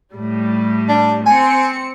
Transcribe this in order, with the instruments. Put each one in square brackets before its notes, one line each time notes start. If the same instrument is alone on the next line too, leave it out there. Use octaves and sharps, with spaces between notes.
[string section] A2 G3
[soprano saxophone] D4
[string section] C4 C#7 [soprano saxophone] G#5